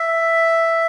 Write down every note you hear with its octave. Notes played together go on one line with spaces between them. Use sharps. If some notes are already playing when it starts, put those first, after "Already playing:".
Already playing: E5